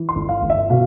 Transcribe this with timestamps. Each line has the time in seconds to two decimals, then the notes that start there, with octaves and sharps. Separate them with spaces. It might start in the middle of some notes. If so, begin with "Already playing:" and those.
Already playing: E3
0.09 C6
0.15 G1
0.29 F5
0.43 G1
0.50 E5
0.70 B2 F5